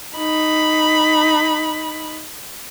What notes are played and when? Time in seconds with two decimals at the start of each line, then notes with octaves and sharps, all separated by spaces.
0.18 D#4 B5